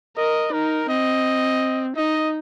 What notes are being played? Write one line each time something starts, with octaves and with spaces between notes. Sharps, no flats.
A#4 D#5
D#4 A#4
C4 D#5
D#4 D#5